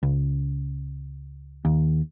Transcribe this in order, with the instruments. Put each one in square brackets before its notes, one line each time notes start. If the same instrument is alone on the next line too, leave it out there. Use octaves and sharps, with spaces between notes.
[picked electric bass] C#2
D#2